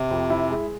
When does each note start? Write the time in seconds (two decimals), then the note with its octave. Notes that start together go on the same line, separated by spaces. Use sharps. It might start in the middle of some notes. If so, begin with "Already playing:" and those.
Already playing: C3
0.11 F2
0.30 E4
0.50 G#3